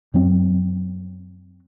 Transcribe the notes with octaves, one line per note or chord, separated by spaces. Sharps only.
F#2 F#3 C4